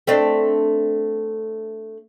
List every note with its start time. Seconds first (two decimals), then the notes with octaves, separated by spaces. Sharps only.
0.07 A3 C4 D4